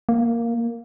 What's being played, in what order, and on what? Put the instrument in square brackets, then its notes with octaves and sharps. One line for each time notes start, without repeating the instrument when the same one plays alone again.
[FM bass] A#3